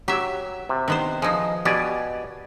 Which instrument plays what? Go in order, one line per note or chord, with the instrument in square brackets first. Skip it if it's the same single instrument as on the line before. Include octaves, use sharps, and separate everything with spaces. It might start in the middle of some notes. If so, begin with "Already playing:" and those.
[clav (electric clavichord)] F#3 [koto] G4 E5
[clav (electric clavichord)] C3
[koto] D#3 B3 C5
[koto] F3 D#4 [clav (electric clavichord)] G#4 D#5
[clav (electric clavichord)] B2 D5 G#5 [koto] G4